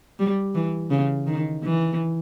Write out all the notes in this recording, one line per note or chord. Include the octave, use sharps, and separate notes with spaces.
G3
E3
C#3
D#3
E3